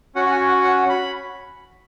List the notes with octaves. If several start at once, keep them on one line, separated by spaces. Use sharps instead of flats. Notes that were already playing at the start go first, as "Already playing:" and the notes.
C#4 F#4 F#5
F#5
G#5
F#5
F#5
B5